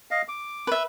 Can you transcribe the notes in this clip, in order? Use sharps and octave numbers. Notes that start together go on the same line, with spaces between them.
D#5 F5
D6
B4 E5